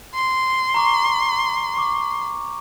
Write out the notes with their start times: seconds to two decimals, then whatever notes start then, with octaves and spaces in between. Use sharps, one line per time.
0.14 C6
0.74 A#5 C#6 D6
1.77 C#6 D6